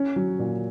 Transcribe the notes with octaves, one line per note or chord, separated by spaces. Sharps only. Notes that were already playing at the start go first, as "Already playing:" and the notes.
Already playing: C#4
F#3
A#2